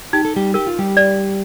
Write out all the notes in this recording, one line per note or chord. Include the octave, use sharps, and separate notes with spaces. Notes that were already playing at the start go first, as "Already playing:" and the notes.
D#4 G4
A4
G3 G4
G4 A#4
F4
G3 G4
D5